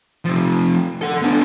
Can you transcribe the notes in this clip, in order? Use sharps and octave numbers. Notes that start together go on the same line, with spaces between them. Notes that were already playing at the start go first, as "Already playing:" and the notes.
C3 F3
A4 F#5
B3 D4